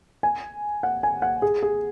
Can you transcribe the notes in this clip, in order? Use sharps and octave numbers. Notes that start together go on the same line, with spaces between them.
G#5
F#5
G#5
F#5
G#4
G#4